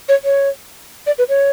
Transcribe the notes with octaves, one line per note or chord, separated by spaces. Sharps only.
C#5
C#5
D5
B4
C#5